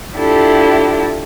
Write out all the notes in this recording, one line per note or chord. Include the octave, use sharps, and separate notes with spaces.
D4 E4 F4 G4 A4